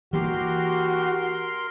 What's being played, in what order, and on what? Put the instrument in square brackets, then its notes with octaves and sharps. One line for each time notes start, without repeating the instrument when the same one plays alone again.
[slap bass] E3 A#3 [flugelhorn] F#4 [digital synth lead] G4 [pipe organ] A#4 C6